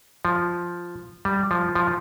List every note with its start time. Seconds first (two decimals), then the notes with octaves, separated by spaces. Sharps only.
0.25 F3
1.25 G3
1.51 F3
1.75 F3